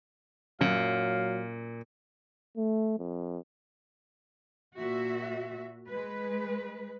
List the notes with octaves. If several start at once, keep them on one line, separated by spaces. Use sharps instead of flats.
F#2 A#2 F#3 F5
A3
F2
A#2 F#4 E5
G#3 B4